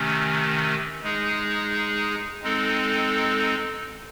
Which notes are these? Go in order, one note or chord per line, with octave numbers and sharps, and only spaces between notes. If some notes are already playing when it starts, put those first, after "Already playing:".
Already playing: C3 D#3 A3 C#4
G#3 D#4 G#4
G#3 C4 D#4 A4